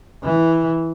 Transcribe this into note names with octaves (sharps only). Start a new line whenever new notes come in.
E3